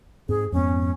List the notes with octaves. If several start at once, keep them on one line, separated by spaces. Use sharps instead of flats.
G#2 C4 G#4
F2 G#2 B3 C#4